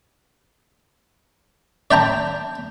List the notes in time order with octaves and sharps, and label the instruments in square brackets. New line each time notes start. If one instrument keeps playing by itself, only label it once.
[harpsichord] D5 E5 G5 A5 A#5